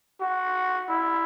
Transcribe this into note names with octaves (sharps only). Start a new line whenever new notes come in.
F#4
E4